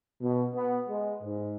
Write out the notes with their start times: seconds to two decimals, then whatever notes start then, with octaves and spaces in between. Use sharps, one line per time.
0.22 B2
0.55 B3
0.89 G#3
1.22 G#2